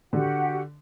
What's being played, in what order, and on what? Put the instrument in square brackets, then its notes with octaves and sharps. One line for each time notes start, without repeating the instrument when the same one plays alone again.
[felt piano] D3 [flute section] F#4 G4 F#5